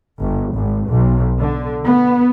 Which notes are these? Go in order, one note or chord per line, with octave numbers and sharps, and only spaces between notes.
G1
G#1
B1
D3
B3